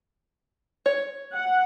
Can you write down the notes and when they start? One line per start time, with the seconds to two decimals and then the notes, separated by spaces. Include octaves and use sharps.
0.86 C#5
1.33 F#5